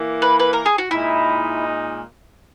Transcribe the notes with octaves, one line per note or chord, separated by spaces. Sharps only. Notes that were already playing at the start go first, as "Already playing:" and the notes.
Already playing: E3 A#3 E4
B4
B4
A#4
G#4
F#4
A#2 G#3 D#4 E4